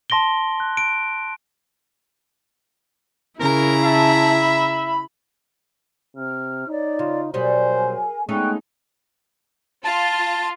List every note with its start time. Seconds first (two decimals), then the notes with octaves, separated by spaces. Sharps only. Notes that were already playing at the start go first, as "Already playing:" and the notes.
0.10 A5 C6 A#6 D7 G7
0.60 F#6
0.77 D7
3.40 C#3 E4 A#4 A#5
3.85 E5 A5
4.41 B5
6.17 C3 F6
6.68 D#4 C#5 D5
6.99 C#3 F4
7.34 B2 F#3 G3 G#4 A#4 C5 D#5 G#5
8.29 G#3 A3 B3 C#4 D#4 G5 C#6 F#6
9.84 F4 A5